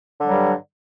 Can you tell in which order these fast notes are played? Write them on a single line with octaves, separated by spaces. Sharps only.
D3 G3 F#3 G2